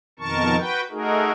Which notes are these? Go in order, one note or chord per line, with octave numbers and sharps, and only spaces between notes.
F2 B2 D#3 A#4 A5 C#6
F#4 B4 G5
A3 D#4 F#4 G#4 A#4